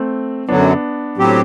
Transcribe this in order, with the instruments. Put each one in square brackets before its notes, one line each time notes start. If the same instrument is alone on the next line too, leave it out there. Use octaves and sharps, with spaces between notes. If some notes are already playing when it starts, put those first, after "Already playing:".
Already playing: [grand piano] A3 C4
[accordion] F#2 D3 F#3 [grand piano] B3 D4
[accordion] A2 F#3 C4 G4